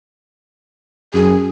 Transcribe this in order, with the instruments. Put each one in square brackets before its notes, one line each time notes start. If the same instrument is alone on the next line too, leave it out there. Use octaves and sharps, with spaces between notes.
[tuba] F#2 [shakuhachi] G#4